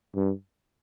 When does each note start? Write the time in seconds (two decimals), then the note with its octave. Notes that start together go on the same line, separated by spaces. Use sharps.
0.16 G2